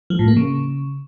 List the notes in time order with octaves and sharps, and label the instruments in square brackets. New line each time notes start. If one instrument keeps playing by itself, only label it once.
[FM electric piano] F3
A2
A#3
C#3